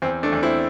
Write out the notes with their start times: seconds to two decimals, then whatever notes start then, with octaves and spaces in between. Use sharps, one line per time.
0.02 E2 C4
0.23 A3 D4
0.32 E2
0.43 C4 E4